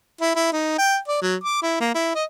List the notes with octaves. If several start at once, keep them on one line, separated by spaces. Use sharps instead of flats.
E4
E4
D#4
G5
D5
F#3
D6
E4
A#3
E4
D#5